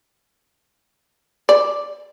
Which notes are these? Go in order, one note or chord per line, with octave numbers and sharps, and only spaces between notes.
D5